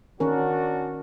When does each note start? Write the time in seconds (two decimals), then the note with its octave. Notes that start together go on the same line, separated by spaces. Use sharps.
0.20 D#3 C#4 D4 F#4 A#4